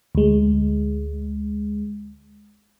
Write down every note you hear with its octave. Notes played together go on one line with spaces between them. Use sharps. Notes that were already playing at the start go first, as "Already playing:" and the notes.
D2 G#3